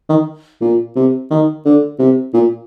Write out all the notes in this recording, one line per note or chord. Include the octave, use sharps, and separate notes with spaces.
D#3
A#2
C3
D#3
D3
C3
A#2